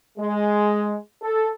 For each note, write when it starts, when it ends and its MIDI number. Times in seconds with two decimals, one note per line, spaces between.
0.18 0.96 56
1.23 1.48 69